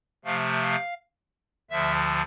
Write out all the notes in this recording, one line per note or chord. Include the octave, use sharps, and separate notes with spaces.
C3 F3 A3 F5
F5
D2 D3 F3 E5